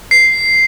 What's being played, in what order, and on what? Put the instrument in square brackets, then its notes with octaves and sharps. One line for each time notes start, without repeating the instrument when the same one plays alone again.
[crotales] C7